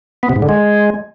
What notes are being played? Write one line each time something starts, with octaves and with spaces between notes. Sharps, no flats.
B3
C3
G#2
D3
G#3